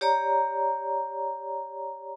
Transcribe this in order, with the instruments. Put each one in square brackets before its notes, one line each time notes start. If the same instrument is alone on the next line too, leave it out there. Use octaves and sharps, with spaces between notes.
[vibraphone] G4 C#5 D5 A#5